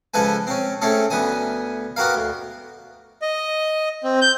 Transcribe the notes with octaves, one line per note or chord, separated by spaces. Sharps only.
C#2 F3 A4 B4 G#5
C4 C#4
A3 C4 C#4 G#4 A4
D2 B3 G#5 D#6
B3 F#4 G4 A#4 F5
D2
D#5
C4
G6